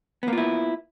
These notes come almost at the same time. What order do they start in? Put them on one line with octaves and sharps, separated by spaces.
B3 A#3 F4 E4